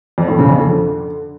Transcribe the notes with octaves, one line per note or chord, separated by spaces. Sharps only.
F2
A2
C#3
F2
D3